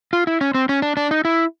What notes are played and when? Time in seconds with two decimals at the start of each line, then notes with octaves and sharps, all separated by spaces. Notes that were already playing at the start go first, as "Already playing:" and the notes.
0.13 F4
0.27 E4
0.41 C#4
0.55 C4
0.69 C#4
0.82 D4
0.97 D4
1.11 D#4
1.25 E4